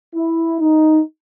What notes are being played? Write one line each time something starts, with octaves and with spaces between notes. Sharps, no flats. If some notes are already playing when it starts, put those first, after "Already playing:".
E4
D#4